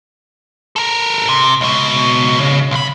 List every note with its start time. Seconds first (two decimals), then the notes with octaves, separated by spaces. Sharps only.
0.76 A4 A#4
1.28 C3
1.61 C#2 B2
2.40 C#3
2.71 B1 B5